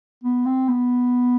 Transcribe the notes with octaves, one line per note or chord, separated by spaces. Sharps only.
B3
C4
B3